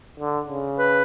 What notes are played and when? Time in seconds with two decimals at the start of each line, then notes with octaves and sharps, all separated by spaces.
0.20 D3
0.49 C#3
0.79 B4